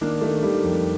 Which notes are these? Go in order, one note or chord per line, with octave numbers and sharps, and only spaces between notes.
D#3 A#3 D4
D#3 A3
D#3 G3
F2